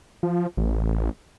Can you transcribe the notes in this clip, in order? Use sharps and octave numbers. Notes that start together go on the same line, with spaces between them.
F3
A1